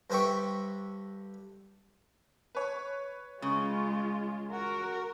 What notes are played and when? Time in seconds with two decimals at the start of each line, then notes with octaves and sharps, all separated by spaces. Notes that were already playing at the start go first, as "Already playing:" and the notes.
0.10 G2 D3 C5 E5 G5 C#6
2.55 B4 C#5
3.42 C#3 G#3 F4
4.52 F#4 A#4